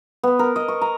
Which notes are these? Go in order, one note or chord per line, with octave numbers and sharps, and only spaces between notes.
B3
A#4
D#5
C#6
A#5